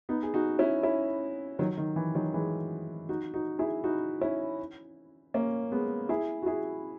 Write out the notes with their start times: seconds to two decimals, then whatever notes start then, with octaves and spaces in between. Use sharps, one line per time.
0.09 B3 D#4
0.23 G#4
0.34 D#4 F#4
0.59 C#4 E4
0.83 C#4 E4
1.59 D#3 F#3
1.78 D#3
1.96 E3
2.15 D#3 F#3
2.34 E3 G#3
3.09 D#4 F#4
3.34 D#4 F#4
3.59 E4 G#4
3.84 D#4 F#4
4.21 C#4 E4
5.34 A#3 C#4
5.72 G#3 B3
6.09 E4 G#4
6.42 F#4
6.46 E4 G#4